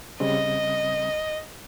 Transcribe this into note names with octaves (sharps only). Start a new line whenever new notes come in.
C#3 G3 C4 D#5